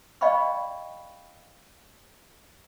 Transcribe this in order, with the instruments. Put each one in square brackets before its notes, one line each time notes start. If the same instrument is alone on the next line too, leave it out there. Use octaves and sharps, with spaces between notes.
[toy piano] D5 D#5 F5 G5 B5 C#6